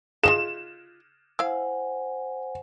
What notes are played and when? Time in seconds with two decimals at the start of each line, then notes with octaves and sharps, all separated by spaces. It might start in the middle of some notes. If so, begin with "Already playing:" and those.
0.24 F4 G#4 D#5 F5 E7
1.39 E4 C5 F5 F#5 G#5 E6